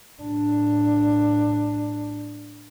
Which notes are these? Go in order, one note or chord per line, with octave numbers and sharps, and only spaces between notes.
A2 D4